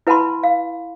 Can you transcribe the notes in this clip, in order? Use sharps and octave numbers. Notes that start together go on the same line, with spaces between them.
E4 B4 F#5 A5 B5 C6
F5